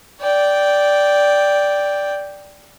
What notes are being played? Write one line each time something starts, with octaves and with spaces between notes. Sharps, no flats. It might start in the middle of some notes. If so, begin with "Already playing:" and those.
D5 G5